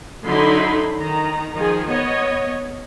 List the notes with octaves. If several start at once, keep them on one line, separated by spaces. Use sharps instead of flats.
D3 F#3 D#4 E4 B5 C6
D#3 A#5
D#3 F3 G#4
B3 C#5 D#5